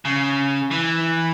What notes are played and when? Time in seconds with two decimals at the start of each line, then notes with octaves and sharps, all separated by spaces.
0.05 C#3
0.71 E3